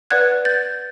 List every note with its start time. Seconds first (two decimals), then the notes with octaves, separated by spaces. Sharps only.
0.10 B4 D5 F#5 F#6 G#6
0.45 G6 A6